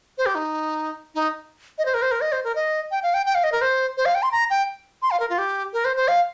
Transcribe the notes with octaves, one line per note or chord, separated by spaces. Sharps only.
C5
G4
D#4
D#4
D#5
C5
A#4
C5
A#4
D#5
C5
A#4
D#5
G5
F5
G5
G5
F5
D#5
A#4
C5
C5
F5
G5
C6
A#5
G5
C6
F5
A#4
F4
G4
A#4
C5
C5
F5